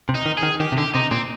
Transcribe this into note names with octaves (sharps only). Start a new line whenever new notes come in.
C3
D#4
D#3
G#4
D#3
D#3 G4
C3
D3 G4
C3 D#4
A#2 C4